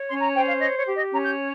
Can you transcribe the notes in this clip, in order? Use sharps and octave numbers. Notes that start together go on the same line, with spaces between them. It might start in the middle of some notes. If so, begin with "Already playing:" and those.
Already playing: C#5
C#4 C6
A#5
C5 G5
F5
C#5 D#5
C#5
G4
D#5
C#4 A#5
G6
C#5